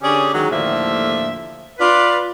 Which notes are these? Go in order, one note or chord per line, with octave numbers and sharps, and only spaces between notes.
D3 C#4 G4 G#4 C#5 D5
D#3 F#3 G#3
D#2 A2 D3 F3 A#3 E5
F4 B4 D5